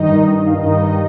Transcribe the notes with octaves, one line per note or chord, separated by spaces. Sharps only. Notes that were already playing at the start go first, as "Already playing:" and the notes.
Already playing: G2 D#3 D#4 D#5
F5
G2 D#3 D#4 D#5